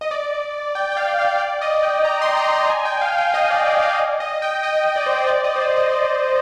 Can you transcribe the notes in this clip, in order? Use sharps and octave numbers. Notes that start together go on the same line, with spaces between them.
D#5
D5
G5
G5
F5
F5
D5
D#5
G5
A#5
C6
A#5
C6
G#5
G5
F5
G5
D#5
D5
D5
F5
D#5
G5
D#5
D5
C5
D5
D#5
C5
D5
D#5
D5